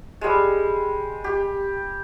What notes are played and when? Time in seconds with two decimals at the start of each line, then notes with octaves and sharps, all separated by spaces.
0.21 G3 G#3
1.24 G4